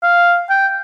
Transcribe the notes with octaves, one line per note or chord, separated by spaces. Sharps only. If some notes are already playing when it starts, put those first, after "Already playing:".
F5
G5